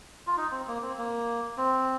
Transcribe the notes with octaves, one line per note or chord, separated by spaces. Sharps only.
F4
D#4
C4
A#3
C4
A#3
C4